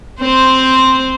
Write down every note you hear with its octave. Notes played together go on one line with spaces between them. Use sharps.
C4 C5